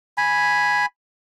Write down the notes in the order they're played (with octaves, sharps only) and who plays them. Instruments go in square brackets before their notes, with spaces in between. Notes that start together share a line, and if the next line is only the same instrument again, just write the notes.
[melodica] G#5 B5